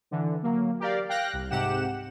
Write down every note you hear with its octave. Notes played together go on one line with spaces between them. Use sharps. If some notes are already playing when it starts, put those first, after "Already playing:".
D3 E3
F#3 A#3
G4 A#4 D5 F5
F5 G5 F#6 A#6
C2
G#2 C3 G4 F#5 E7